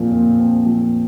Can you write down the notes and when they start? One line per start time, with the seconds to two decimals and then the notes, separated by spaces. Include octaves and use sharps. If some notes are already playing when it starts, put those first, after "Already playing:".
Already playing: A#2 F3 C4
0.12 A#2
0.39 C4
0.66 F3